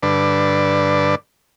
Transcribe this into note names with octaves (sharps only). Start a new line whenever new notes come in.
G2 D3 B4 D5